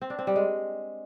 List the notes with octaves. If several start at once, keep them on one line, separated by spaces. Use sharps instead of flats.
C4
D4
C4
G3
G#3